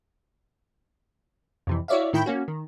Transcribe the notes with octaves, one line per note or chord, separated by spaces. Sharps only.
F2 C3 E3
E4 F#4 C#5 D5 E5 F5
A2 D#3 E4 G5 B5 G6
A#3 C#4 F#4
D#3